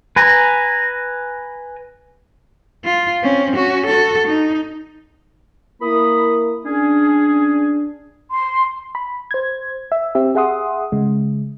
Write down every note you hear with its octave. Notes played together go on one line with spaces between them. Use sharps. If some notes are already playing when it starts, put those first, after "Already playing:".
B4 G#5 A#5
F4
C4 C#4
C#4 F#4
F#4 A4
D#4
A#3 E4 A#4 B5 D#6
C#4 D4 G#4
C6
B5
C5 G#6
E5
C4 G4 E5
G#4 E5 F#5 C6 D#6
C#3 G#3